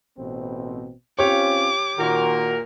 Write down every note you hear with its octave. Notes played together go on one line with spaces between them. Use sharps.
A1 B2 C4
C4 C#4 F4 G4 C#5 D6
A#2 D#3 F#4 A#4